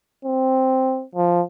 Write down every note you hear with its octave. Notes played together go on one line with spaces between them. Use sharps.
C4
F3